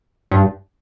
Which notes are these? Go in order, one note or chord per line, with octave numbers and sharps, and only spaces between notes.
G2